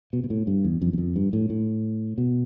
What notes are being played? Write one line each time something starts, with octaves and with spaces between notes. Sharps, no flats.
B2
B2
A2
G2
E2
F2
E2
F2
G2
A2
A2
B2